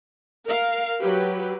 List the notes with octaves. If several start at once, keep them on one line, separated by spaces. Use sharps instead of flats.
A#4 F5
F#3 G4 B4